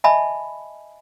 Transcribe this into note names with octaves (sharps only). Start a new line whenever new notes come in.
D#5 E5 G#5 A5 B5